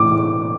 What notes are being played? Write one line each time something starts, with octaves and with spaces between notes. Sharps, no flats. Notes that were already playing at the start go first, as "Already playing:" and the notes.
Already playing: A2 E3 D6